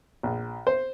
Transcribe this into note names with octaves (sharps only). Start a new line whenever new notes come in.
A#1
C5